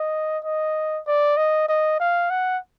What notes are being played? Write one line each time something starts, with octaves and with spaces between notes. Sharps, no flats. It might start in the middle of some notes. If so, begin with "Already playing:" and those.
Already playing: D#5
D#5
D5
D#5
D#5
F5
F#5